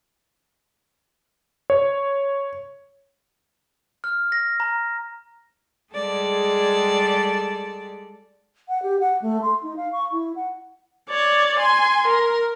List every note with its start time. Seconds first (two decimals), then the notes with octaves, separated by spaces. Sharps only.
1.70 C#5
4.04 F6
4.32 A#6
4.60 A#5
5.94 G3 G#3 G#4 A4 D5
8.69 F#5
8.83 G4
9.00 F#5
9.22 A3
9.42 C6
9.63 D#4
9.77 F5
9.93 C#6
10.12 E4
10.36 F#5
11.10 C#5 D5
11.60 G#5 C6
12.08 A#4